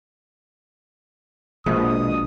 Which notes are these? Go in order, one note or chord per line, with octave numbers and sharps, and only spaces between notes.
A#1 B2 G#3 D#6